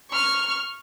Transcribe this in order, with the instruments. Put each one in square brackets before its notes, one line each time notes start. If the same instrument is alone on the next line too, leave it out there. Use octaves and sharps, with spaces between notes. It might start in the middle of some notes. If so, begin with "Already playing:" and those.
[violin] C#6 F6